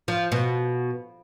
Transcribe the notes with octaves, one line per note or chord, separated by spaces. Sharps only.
F3
B2